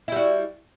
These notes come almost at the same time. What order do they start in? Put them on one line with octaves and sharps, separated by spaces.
E4 G3 F#4